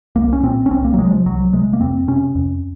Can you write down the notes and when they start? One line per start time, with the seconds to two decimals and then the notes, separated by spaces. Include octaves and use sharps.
0.16 C2 A#3
0.33 C#4
0.43 A#2 C4
0.66 C#4
0.71 C2 C4
0.84 A#3
0.94 F#3
0.98 C3 G#3
1.12 F3
1.25 C2 F#3
1.53 C3 G#3
1.73 A#3
1.80 F2 C4
2.08 C3 C#4
2.35 F2